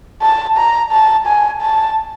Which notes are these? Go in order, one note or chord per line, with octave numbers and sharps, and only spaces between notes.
A5
A#5
A5
G#5
A5